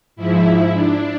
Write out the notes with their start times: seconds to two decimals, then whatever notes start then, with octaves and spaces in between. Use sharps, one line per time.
0.16 G#2 F3 E4
0.72 D4